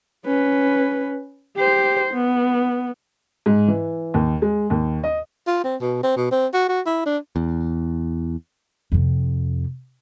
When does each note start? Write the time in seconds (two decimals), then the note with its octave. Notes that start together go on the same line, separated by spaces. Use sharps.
0.26 C#4 B4
1.57 G4 C5
2.14 B3
3.46 G#2
3.68 E3
4.14 D#2
4.42 G#3
4.70 D#2
5.04 D#5
5.47 F4
5.64 C4
5.81 B2
6.03 C4
6.17 B2
6.31 C4
6.54 F#4
6.69 F#4
6.86 E4
7.06 D4
7.36 E2
8.92 F2 C3